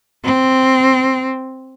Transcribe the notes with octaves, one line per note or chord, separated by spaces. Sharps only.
C4